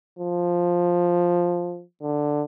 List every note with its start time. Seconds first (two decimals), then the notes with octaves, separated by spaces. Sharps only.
0.19 F3
2.02 D3